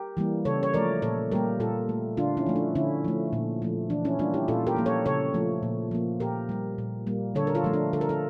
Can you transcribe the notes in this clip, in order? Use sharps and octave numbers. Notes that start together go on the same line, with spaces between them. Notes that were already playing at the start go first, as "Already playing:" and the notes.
Already playing: G4 A#4
E3 G3 A#3
C#3 A4 C#5
C#5
F3 A3 A#4 D5
A#2 A4 C#5
G3 A#3 G4 A#4
A#2 F4 A4
A3
D3 D4 F4
C#4 E4
F3 A3
D4
D3 C#4 E4
F3 A3
A#2
F3 A3
E3 D4
C#4 E4
G3 A#3 D4 F4
E4 G4
A#2 F4 A4
G4 A#4
F3 A#3
A4 C#5
C#3 A4 C#5
F3 A3
A#2
F3 A#3
A#2 G4 A#4
G3 A#3
A#2
G3 A#3
D3 A4 C#5
A#4
F4 A4
F3 A3
D4
D3 A4
A#4
F4 A4